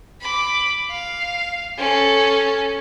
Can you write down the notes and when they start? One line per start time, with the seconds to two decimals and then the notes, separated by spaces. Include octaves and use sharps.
0.21 B5 D6
0.90 F5
1.78 C#4 A4